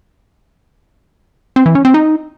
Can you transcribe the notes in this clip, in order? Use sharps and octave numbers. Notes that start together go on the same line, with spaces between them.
C4
E3
C#4
C4
D#4